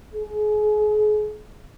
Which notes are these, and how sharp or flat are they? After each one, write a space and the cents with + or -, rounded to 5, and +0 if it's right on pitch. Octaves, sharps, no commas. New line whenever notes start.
G#4 +35